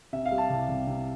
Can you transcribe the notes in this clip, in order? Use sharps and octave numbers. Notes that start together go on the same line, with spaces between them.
C3 E5
F5
G3
A5
C2
C2
C3